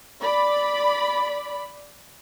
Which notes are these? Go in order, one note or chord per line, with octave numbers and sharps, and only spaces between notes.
D5 B5